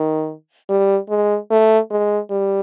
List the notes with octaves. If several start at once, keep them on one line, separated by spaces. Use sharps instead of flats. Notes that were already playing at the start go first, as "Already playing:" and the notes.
Already playing: D#3
G3
G#3
A3
G#3
G3